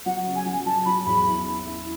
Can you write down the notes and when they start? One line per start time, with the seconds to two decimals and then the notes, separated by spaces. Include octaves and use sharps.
0.06 F#3 F#5
0.26 C#3
0.36 G#5
0.46 F#3
0.66 F#3 A5
0.86 F#3 B5
1.06 E2 B5
1.26 E4
1.46 E4
1.66 E4